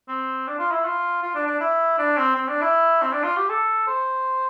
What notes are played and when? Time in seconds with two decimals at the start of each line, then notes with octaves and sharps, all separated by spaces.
0.08 C4
0.47 D4
0.59 F4
0.72 E4
0.85 F4
1.23 F4
1.35 D4
1.47 D4
1.60 E4
1.99 D4
2.18 C4
2.36 C4
2.48 D4
2.62 E4
3.02 C4
3.12 D4
3.24 F4
3.37 G4
3.49 A4
3.87 C5